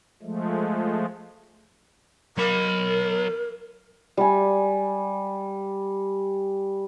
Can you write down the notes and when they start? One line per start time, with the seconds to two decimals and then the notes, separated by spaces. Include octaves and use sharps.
0.23 F3 G#3 A3
2.37 F#3 A#4 B5
4.17 G3 G#5